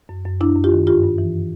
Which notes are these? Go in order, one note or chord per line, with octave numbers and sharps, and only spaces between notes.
F#2
F#2
F#2 D4 E4
F#2
F4 G4
D#3
G2 F4 G4
G2
E3